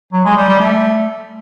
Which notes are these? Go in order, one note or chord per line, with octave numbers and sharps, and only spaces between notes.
F#3
G#3
G3
G3
A3